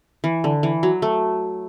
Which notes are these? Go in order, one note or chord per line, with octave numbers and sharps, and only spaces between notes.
E3
D3
E3
F#3
A3